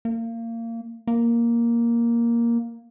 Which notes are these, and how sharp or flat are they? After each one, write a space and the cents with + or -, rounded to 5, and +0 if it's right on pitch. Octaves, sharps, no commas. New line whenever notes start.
A#3 -25
A#3 +5